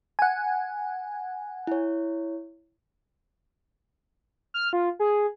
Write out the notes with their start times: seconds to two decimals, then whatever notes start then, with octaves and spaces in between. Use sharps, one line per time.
0.19 F#5 G#5
1.67 E4 C#5
4.54 F6
4.73 F4
4.99 G#4